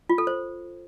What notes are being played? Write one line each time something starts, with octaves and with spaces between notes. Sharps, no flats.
F4
A4
C5